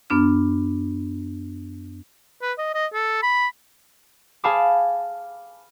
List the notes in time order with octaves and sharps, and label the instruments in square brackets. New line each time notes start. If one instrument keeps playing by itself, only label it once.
[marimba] F#2 B3 D4 F6
[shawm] B4
D#5
D#5
A4
B5
[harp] G#4 F5 G#5 A5 B5 D6